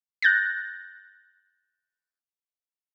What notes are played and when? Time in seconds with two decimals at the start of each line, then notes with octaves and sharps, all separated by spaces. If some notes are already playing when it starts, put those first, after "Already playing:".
0.22 F#6 G6 A6 A#6